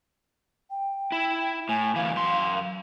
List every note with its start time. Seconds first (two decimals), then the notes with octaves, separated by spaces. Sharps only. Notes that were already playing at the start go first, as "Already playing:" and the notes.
0.71 G5
1.12 E4
1.69 A2 G#5
1.96 D2 E3 F5
2.16 F#2 C6